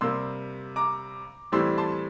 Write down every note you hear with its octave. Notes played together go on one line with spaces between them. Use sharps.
C3 G3 A#3 C6 E6
A#5 D6
A2 E3 G3 C4 C6 E6
A5 C6